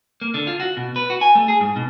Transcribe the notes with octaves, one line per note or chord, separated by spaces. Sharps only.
A#3
D3
F4
F#4
B2
B4
F#4
G#5
A3
G#4
G#2
B2